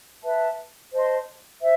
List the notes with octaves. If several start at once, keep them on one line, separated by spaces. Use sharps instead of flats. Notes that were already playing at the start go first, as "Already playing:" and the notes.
B4 E5 A5
C5 D#5 A5 C6
C5 E5